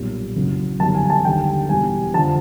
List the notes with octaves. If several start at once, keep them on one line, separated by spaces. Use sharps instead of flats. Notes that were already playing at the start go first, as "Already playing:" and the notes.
Already playing: B1 A#2 G3
F#1 F#2 C#3 F#3
G1 F#2 D#3 G3 A5
G#5
G#5
A5
D#2 D3 G3 G5
E1 E2 B2 G3 G#5
F2 D3 F3 A5